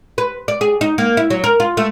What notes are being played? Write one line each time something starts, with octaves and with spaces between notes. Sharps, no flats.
B4
D5
G#4
D#4
A#3
E4
F#3
A#4
F4
A3